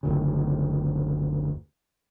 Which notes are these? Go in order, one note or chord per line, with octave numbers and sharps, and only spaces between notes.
F#1 D2 C#3